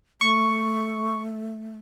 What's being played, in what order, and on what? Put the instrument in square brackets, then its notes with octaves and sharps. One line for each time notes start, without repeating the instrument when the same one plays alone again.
[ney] A3 [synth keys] C#6